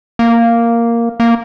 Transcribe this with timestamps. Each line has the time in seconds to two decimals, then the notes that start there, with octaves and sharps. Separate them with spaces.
0.19 A#3
1.20 A#3